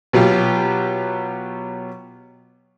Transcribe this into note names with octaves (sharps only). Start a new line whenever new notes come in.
B2 F#3 F4 G4